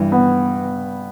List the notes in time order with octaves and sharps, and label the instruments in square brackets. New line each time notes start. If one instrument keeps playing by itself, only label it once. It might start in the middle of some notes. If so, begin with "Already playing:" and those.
Already playing: [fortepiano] G2 [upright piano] E3
[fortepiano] B3